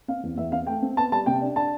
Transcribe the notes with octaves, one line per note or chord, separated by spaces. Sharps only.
C4 F5
E2
E2 E5
C4 F5
A3 G5
C4
B3 A5
G3 A5
C3 G5
D4
D4 A5